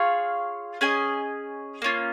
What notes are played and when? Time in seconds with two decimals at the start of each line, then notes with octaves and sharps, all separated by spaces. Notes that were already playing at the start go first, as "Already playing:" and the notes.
Already playing: F4 G#4 C#5 F5
0.81 C#4 G#4 D#5 G#5
1.82 A#3 C#4 F4